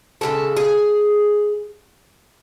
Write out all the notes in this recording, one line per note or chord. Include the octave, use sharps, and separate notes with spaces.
C#3 E3 G#3 A4
G#4